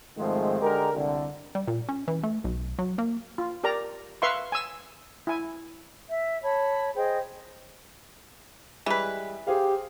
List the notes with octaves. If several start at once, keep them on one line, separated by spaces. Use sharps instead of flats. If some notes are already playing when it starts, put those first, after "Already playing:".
G#2 D#3 F3 G#3 A3 C4
D3 G#3 G4 A#4
C2 D3
G3
A#2
C#4
E3
A3
B1
F#3
A#3
F4
G4 A#4 D5 A#5
B4 E5 F5 C6 C#6
G#5 E6
E4 G#5
E5
C#5 A5 B5
G#4 C5 D#5 G5
E3 G3 G#3 B4
G4 G#4 C5 F5